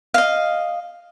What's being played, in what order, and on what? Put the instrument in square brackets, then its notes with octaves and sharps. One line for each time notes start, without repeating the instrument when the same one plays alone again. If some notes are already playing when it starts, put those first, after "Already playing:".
[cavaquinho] D#5 F5